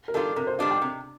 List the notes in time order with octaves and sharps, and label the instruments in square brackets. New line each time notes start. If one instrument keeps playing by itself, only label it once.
[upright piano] A#4
[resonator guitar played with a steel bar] D#3 G3 D4 F4 [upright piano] A4
[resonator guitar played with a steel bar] C3 [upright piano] A#4
[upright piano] C5
[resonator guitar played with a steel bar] D#3 G3 D4 F4 [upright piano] D#5
[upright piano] G5
[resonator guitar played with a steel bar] C3